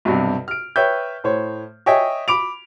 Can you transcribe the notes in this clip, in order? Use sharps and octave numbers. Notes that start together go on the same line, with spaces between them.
B1 G2 C3
F6 D7
B4 C#5 E5 G5 G6
A2 C5 C#5
C#5 D#5 E5 G5 G#5
B5 D6 D7 F7